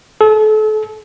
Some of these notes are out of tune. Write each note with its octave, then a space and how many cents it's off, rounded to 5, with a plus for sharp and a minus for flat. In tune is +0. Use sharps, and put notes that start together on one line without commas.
A4 -35